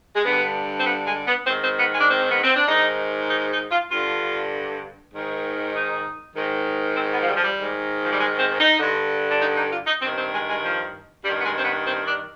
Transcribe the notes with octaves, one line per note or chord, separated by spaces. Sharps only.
G#3
G2 D3 B3
C4
B3
G#3
B3
G#2 D#3 C4
C4
B3
G#3
D4
C4
B3
C4
D4
G#2 D#3 D#4
D#4
D#4
F4
G2 D3 F4
G#2 D#3
D#4
G#2 D#3
C4
B3
F3
G3
F3
G3
G#2 D#3
F3
G3
G#3
C4
D#4
G2 D3
D4
D#4
D#4
F4
D#4
G2 D#3 C4
C4
G#3
G#3
F3
G2 D#3 G3
B3
G#3
C4
B3
C4
D4